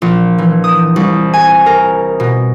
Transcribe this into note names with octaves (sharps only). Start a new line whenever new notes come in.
A#1
E3
D#6
C2
G#5
A#4
B2